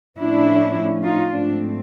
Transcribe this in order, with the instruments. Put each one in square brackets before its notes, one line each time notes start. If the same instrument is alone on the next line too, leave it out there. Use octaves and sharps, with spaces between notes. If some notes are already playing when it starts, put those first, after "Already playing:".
[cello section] A2 F3 A3 C#4 D4 E4
D#4 F4
G#2 F3 A3 C4 D4